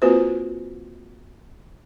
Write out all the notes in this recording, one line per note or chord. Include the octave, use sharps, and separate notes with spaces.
A#3 C4 F4 F#4 B4 C5